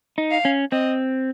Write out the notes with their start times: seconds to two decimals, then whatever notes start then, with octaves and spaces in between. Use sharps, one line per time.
0.18 D#4
0.31 F5
0.45 C#4
0.72 C4 D#5